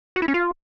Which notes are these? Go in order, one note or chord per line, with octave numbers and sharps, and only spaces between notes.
F#4
E4
C#4
F4